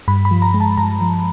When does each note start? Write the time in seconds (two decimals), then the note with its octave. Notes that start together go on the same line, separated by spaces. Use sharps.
0.08 G2 B5
0.25 B5
0.31 F3
0.42 A#5
0.54 G#3
0.60 A5
0.77 G2 A#5
1.01 F3